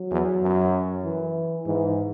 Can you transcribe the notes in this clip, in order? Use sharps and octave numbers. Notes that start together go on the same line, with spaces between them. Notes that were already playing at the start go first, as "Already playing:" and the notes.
Already playing: F#3
E2
F#2
E3
G#2 E3